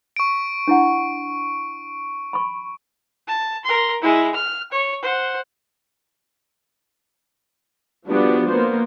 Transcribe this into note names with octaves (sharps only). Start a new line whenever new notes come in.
C#6 D7
D4 E4 F#5
B5 C#6
A5
A#4 C6
G#3 E4
F6
C#5
C5 F#5
F3 G3 B3 D4 F#4 G4
A#3 B3 C5